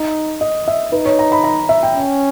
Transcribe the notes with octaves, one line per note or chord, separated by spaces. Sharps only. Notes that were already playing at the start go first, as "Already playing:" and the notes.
Already playing: D#4
D#5
E5
D#4 B4
C#5
A#5
B5
A#5
E5
G5
C#4